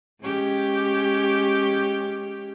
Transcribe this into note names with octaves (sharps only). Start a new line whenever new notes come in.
G#3 C#4 G4